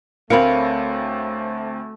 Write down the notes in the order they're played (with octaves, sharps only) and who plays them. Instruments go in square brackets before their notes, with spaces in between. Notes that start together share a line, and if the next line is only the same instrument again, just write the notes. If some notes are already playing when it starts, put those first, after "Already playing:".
[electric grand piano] D2 C4 C#7 [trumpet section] A3 [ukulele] A#4 C#5 B5 [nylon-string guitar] F5